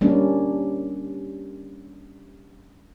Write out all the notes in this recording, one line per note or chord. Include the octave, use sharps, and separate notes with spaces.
G3 A#3 C#4 D4